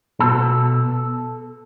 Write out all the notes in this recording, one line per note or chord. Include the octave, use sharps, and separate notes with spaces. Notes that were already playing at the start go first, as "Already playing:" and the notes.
B2 A4